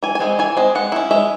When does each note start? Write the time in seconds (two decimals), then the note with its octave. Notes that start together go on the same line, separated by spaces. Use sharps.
0.03 E3 G#5
0.15 G#5
0.20 G#3 C4
0.39 E3 G#5
0.57 G#3 C4
0.75 G#3 F#5
0.92 C#4 E4
1.11 G#3 E5